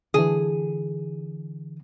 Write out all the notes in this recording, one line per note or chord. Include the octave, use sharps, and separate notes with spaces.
D3 E3 G#4